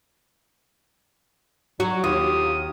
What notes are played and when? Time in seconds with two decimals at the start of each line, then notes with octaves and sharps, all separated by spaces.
1.80 F#3 F#4
2.04 D#2 F4 G4 D#6